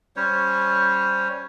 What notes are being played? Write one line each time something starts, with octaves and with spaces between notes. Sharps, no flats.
G3 C#4 C5 C#5